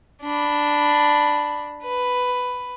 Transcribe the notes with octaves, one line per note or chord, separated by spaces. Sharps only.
D4 B5
B4